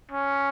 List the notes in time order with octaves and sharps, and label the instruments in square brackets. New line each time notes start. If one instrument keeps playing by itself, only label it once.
[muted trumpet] C#4